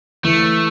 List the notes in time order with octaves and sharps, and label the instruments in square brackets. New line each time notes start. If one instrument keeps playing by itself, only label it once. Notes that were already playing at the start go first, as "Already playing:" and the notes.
[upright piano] E3 [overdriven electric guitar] A3